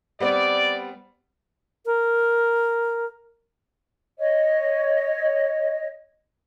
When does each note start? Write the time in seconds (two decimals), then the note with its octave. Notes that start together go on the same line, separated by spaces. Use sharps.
0.20 G3 B3 C4 D5
1.86 A#4
4.19 C#5 D#5